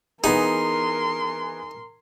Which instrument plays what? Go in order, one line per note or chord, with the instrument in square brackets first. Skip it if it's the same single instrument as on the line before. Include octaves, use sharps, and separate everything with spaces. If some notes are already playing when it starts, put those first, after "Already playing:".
[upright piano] E3 B3 G#4 [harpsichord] D#4 [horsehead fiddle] A#4 [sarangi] C6